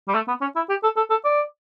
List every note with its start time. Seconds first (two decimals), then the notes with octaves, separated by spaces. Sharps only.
0.08 G3
0.14 A3
0.28 B3
0.41 C#4
0.56 E4
0.69 G4
0.83 A4
0.96 A4
1.10 A4
1.25 D5